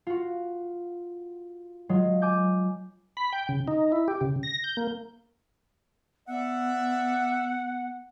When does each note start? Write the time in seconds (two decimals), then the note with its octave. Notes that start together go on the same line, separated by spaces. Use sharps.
0.07 F4 F#4
1.89 F#3 G#3 F4
2.22 G#5 D6 G6
3.17 B5
3.33 G5
3.49 C#3
3.68 D#4
3.92 E4
4.08 G4
4.21 C#3
4.43 A#6
4.64 G6
4.77 A#3
6.28 B3 D5 E5 F#5